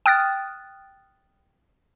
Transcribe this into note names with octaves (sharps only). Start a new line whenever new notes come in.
G5 D#6 F6 F#6 A6